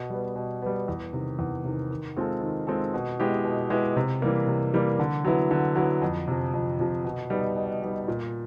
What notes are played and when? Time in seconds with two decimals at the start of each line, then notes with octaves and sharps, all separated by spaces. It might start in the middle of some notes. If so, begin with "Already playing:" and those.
Already playing: B2
0.10 G3 B3
0.36 B2
0.62 G3 B3
0.88 E2
1.13 C3 D#3
1.39 E2
1.64 C3 D#3
1.91 D#3
2.17 G#3 C4 F4 A4
2.41 D#3
2.67 G#3 C4 F4 A4
2.94 B2
3.20 G#3 B3 E4 G4
3.45 B2
3.70 G#3 B3 E4 G4
3.96 C3
4.22 E3 G3 A#3
4.47 C3
4.74 E3 G3 A#3
4.99 D3
5.25 F#3 B3 E4
5.51 D3
5.76 F#3 B3 E4
6.02 F2
6.28 C3 F3
6.54 F2
6.79 C3 F3
7.05 B2
7.30 G3 B3 D#4
7.56 B2
7.82 G3 B3 D#4
8.08 A#2